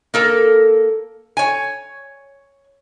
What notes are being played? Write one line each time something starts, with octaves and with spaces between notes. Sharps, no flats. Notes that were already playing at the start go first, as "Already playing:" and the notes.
A#3 A4 A#4
C#5 G#5